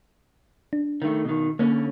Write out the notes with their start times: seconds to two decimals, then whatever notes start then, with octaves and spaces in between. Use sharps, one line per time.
0.73 D4
1.02 D#3 A3
1.25 B2 D#3
1.59 D3 A#3 C#4